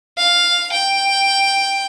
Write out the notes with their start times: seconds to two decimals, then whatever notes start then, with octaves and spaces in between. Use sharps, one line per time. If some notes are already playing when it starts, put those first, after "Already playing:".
0.18 F5
0.72 G5